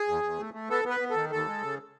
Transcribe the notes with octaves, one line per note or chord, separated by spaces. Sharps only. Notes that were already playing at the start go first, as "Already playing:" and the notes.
Already playing: G#4
E2
E2
A3
A3
B3 A4
B3
B4
B3
D#3 A4
D#2 A4
G#3
C#3